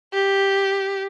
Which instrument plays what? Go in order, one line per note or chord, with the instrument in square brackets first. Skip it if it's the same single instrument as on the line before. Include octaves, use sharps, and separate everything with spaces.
[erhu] G4